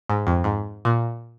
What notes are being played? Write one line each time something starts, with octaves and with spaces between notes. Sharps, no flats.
G#2
F2
G#2
A#2